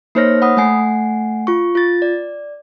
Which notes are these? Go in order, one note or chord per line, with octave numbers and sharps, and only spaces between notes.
A#3 D#4 C5 C#5 F6 A#6
F#5 B5 D#6
A3 F#5 G#5 C7
F4 C#6
F4 A6
D5